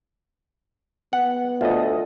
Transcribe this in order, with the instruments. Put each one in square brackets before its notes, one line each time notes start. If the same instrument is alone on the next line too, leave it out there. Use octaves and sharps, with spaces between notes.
[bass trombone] B3 [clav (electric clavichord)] F#5
[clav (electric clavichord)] D2 [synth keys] F4 A4 D#5